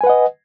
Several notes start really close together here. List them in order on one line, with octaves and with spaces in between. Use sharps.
G#5 B4 F#5 D#5